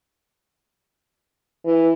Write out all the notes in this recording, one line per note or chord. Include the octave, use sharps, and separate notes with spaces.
E3